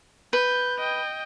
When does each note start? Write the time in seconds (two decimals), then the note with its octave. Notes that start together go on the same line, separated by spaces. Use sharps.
0.33 B4 G6
0.79 D#5 G5